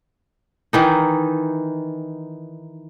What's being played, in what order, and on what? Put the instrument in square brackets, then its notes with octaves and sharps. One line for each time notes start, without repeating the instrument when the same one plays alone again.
[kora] D#3 E3 D#4